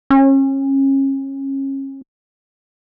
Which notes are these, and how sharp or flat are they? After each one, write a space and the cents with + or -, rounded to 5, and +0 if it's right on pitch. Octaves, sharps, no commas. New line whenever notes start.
C#4 -30